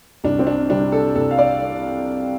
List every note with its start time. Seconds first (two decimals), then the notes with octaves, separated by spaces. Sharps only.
0.24 C2 D4
0.39 C4
0.47 D4
0.70 C3 G3 D4
0.92 A4
1.15 C2 A4
1.31 F5
1.38 D5